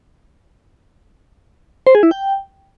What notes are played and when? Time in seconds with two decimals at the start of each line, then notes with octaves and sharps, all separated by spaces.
1.87 C5
1.95 G#4
2.03 E4
2.11 G5